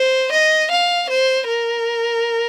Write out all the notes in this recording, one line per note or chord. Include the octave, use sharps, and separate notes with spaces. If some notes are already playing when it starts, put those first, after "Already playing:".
Already playing: C5
D#5
F5
C5
A#4